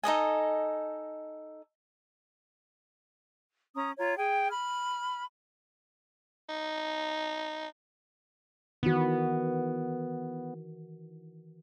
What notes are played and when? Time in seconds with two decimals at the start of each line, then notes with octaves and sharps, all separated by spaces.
0.03 D#4 A4 D#5 G#5
3.75 C#4 A#5 D#6
3.97 F4 C#5 A#5
4.16 G#4 G5
4.49 B5 F6
6.49 D#4
8.83 D#3 E3 B3 F#4